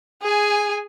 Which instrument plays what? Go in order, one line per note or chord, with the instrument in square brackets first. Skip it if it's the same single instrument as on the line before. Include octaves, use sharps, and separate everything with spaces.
[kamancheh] G#4 G#5